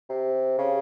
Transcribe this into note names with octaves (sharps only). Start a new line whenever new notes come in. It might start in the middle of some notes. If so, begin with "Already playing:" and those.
C3
C#3